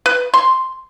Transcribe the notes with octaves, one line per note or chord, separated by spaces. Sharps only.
B4
C6